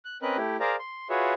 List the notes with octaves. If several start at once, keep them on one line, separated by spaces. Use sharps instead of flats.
F#6
C4 C#4 A#4 B4 D#5 F#6
A3 E4 G4
G#4 A#4 C5 D5 F5 A#5
C6
F4 F#4 G#4 B4 C#5 E5